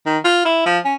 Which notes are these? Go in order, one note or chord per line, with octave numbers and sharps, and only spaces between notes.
D#3
F4
E4
F3
C#4